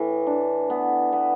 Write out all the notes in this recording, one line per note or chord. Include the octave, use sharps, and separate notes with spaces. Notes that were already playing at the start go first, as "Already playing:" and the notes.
Already playing: A2 E3
D4
B3
B3